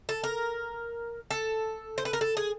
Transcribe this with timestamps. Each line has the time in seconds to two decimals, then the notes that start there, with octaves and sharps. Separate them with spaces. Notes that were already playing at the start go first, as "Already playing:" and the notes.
0.09 A4
0.23 A#4
1.31 A4
1.98 C5
2.05 B4
2.13 A#4
2.21 A4
2.37 G#4